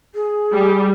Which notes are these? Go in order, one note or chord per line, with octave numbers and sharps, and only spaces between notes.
G#4
G3